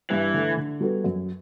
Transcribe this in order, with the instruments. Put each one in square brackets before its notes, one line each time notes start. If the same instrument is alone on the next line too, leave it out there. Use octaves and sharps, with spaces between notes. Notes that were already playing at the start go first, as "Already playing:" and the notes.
[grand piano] G2 [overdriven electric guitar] E3
[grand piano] D3 A3
D3
G3 B3 F#4 A4
F#2